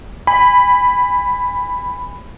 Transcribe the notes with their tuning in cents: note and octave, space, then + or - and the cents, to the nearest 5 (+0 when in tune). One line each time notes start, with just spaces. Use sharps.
G#5 -30 B5 +0